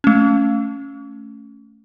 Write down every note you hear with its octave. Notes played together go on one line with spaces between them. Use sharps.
A3 C#4